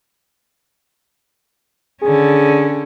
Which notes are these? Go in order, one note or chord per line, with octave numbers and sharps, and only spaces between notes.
D3 C#4 G#4